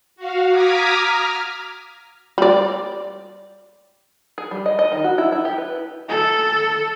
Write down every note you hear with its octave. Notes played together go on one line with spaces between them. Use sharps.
F#4 F5
A#5 D6 D#6 F6 G#6 B6
F6
G3 D5
G#4
G3
D#5
D#5
D#3
F#4
E4
E4
G4
B4
A4